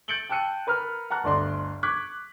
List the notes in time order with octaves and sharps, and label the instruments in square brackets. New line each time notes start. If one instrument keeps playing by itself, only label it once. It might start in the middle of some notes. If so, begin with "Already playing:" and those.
[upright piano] G6 A6 C#7 D7 F#7 G7
G5 A5 E6 F#6 C#7 D#7
A#4 B4 A#5 F6
F#5 A5 A#5 F#6
G1 D2 D5 D#5 C6
C#6 D6 F#6 G#6 B6